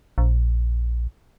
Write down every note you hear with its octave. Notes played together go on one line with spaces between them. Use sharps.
A#1